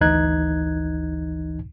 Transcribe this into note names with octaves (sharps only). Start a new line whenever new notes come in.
G#1 D2 E3 D#4 F#6 G#6